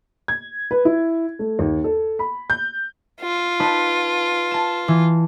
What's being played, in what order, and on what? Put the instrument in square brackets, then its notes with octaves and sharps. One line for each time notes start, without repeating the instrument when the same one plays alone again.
[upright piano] G#6
B4
E4
A3
D#2
A4
B5
G6
[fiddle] F4
[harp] D#4 B4 A5
A5 E7
E3